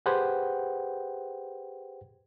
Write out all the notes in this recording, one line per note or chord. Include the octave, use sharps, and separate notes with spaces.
G4 G#4 B4 C5 F#5 G5